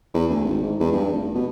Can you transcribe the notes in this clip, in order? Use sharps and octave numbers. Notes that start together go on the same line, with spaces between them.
E2
D2
G#1
G#2
E2
G2
F1
B2